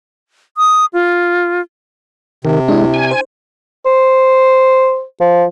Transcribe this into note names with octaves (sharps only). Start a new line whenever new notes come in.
D#6
F4
C3 D#3
G#3 D4 E4
G#5
C5
C5
F3